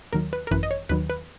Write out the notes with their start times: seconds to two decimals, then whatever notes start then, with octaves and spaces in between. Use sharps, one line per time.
0.13 D#2 D#3 F#3 A#4
0.33 B4
0.47 A#4
0.51 G#1 F#2 E3 B4
0.63 D#5
0.71 C#5
0.89 D#2 D#3 F#3 B4
1.10 B4